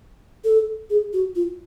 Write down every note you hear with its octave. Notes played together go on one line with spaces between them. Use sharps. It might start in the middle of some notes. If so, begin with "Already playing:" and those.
A4
G#4
F#4
F4